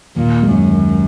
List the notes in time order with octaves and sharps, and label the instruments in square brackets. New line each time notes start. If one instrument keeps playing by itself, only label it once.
[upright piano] D#2 [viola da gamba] A#2
[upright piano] G#3
[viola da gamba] F#2
[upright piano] D#2